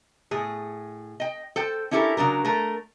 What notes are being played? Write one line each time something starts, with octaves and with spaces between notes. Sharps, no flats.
A2 G#4
D#5 G5
A4 C5 G5
C#4 D4 E4 G4 A4 A#4
C#3 F#3 D4 A#4
A3 A#4